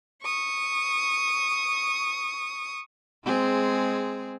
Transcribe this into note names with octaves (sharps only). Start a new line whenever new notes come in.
C#6 D#6
G#3 C4 G#4